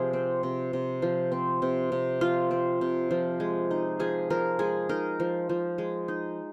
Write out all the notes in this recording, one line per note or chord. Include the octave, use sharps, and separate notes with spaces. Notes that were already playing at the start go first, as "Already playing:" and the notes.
Already playing: C3 F3 G#4
C4
C3
C3
F3
C4
C3
C3
F3 F4
C4
C3
F3
G#3
D#4
F3 G#4
F3 A#4
G#3 G#4
D#4 A#4
F3
F3
G#3
D#4